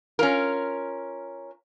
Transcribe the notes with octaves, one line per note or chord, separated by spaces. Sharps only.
C#4 F4 A#4